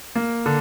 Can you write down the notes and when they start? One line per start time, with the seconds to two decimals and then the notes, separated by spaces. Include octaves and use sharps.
0.16 A#3
0.46 D3